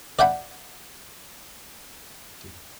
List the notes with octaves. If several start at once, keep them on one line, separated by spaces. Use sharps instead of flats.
D5 E5 F#5 G5 B5